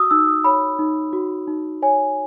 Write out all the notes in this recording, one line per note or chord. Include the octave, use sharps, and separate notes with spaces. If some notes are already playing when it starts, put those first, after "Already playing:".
Already playing: F#4 D#6 E6
D#4 E6
D#6
C#5 B5
D#4
F#4
D#4
C#5 G#5